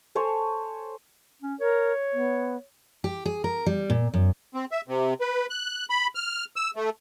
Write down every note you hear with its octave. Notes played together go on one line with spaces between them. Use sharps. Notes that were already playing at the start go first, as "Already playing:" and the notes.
A4 C5 C#5 G#5
C#4
A#4 C#5
B3
G4
G#4
A#4
G3
A#2
F#2
C4
E5
C3
B4
F#6
B5
F6
E6
A3